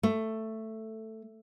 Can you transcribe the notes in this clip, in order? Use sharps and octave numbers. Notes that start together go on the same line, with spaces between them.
A3